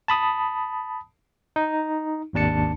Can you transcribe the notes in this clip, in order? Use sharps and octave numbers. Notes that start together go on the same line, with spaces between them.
A5 B5 D#6
D#4
G#1 D#2 D4 A5 C#7